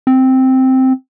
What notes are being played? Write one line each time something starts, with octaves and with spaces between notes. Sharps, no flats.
C4